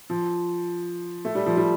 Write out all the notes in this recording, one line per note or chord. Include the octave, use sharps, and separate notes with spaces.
F3
A3
G3
F3
G3